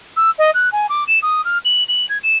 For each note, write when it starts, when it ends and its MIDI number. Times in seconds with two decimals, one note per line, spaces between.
0.17 0.31 88
0.39 0.51 75
0.54 0.72 90
0.72 0.87 80
0.89 1.04 86
1.08 1.19 100
1.22 1.44 87
1.45 1.59 89
1.65 1.84 102
1.89 2.06 102
2.09 2.18 92
2.24 2.38 100